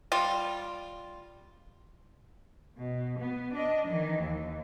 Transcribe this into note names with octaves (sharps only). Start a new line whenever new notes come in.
G3 F4
B2
B3
D4 D#5
D#3 E3
D#2